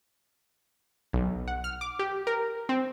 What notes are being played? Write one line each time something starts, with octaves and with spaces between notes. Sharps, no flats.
B1
F#5
F6
D6
G4
A#4
C4